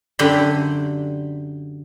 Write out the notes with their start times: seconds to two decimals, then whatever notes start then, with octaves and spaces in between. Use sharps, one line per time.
0.19 F#2 D3 G4 B5 C6